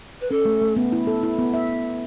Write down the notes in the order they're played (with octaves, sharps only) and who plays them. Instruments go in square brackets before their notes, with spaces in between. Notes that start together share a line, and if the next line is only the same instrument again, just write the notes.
[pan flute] B4
[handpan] C#4 [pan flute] A4
[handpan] A3
A3
B3
E4
A4
E4
B3
E5